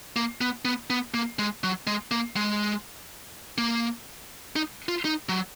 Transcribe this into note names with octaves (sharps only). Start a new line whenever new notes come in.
A#3
B3
B3
B3
A#3
G#3
F#3
G#3
A#3
G#3
A#3
D#4
F4
D#4
F#3